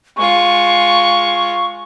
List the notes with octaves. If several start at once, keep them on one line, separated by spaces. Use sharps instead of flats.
G#3 F4 C#6